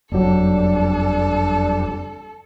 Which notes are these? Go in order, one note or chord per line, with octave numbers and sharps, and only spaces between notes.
F#1 F2 F#3 G3 D4 A4